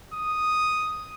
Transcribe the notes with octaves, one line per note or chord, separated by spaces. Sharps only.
D#6